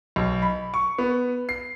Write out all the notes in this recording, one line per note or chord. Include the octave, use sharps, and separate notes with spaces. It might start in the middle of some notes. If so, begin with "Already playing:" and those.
B1
B5
C#6
B3
C7